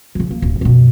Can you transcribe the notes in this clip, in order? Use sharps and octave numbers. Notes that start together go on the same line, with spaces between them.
C#3 F3
A#3
D1 A1
F#2 B2